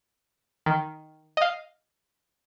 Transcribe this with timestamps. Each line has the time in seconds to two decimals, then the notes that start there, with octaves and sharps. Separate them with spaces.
0.66 D#3
1.37 D#5 F5